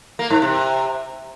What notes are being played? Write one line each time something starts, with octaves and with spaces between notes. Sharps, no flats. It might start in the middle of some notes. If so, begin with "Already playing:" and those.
A#3
G#2
C3